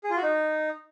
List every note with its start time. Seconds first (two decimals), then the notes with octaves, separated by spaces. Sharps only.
0.04 G#4
0.10 F4
0.16 F#4
0.23 D#4